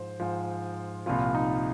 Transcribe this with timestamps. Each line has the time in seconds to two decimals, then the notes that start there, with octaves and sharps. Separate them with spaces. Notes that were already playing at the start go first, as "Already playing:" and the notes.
Already playing: G#2 F3 C5
0.20 G#2 F3
1.06 C2 A#2 F3 F4
1.35 D#4